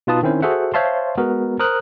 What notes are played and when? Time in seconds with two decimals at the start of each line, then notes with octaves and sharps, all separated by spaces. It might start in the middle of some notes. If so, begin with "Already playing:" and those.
0.07 B2 D#4 F4 B4 A5 D#6
0.23 D#3 C4 C#4 E4 C5
0.42 F#4 G#4 A4 C5 E5 F#5
0.74 C5 C#5 E5 F5 A5 C6
1.17 G#3 B3 F#4 A#4
1.59 A#4 C5 D#6 F#6